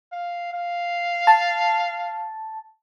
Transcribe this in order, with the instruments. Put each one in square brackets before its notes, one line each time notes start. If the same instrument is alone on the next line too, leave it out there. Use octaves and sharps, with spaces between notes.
[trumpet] F5
F5
[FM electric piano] A5